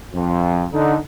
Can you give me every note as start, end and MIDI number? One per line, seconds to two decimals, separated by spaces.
0.14 0.65 41
0.73 0.96 50
0.73 0.96 63